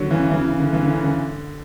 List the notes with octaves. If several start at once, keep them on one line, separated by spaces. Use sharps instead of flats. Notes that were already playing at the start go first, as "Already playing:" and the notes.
Already playing: D3 F#3
C#3 E3
C#3 E3
C#3
D3
C#3 E3
D3
C#3
D3